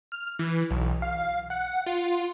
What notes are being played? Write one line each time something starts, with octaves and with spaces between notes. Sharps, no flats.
F6
E3
B1
F5
F#5
F4